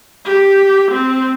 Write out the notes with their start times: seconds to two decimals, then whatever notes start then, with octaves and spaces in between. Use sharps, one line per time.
0.25 G4
0.91 C4